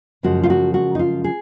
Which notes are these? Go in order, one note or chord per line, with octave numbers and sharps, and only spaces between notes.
F#2 C#3 F3 G#3 F#4
F4
F#4
F#4
D#4
F4
G#4